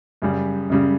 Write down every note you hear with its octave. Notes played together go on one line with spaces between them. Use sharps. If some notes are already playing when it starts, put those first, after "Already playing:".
F#2 C#3 G3
F#2 C#3 G3